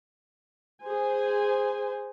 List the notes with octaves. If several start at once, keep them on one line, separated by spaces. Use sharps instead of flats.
G#4 C5 G#5